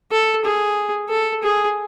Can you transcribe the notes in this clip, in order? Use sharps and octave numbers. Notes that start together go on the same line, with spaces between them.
A4
G#4
A4
G#4